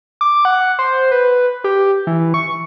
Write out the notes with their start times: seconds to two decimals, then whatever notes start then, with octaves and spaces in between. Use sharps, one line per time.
0.21 D6
0.45 F#5
0.79 C5
1.11 B4
1.64 G4
2.07 E3
2.34 C#6